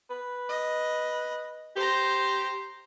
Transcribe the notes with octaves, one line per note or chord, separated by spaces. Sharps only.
B4
D#5
G4 C5 A#5